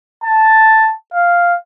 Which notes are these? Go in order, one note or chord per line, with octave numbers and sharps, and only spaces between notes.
A5
F5